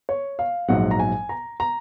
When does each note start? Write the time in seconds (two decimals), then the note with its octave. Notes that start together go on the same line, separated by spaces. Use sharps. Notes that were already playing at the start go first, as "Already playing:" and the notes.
0.09 C#5
0.39 F5
0.68 A#1 G#2 F#3 F#5
0.91 A#5
1.00 G#5
1.29 A#5
1.60 A#5